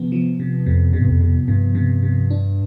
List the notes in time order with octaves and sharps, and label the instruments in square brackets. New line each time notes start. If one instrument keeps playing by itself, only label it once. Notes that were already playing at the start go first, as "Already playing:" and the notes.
Already playing: [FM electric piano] C3 F3 B3
F3
C3
[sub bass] F2 [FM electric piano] C3
[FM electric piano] C3
[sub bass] G2
F2
[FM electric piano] C3
[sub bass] G2 [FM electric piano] C3
[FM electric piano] C3
C3
D4